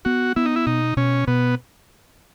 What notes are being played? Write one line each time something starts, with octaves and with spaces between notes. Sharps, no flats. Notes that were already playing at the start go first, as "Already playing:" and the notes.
B3 F#4
B3 E4
D#4
E4
B2 D#4
B2 C#4
B2 B3